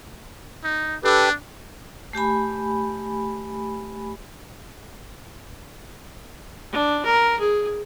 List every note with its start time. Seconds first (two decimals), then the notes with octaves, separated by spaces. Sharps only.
0.64 D#4
1.04 D4 G4 A4 B4
2.13 A3 G4 G#5 B5
6.72 D4
7.06 A#4
7.40 G#4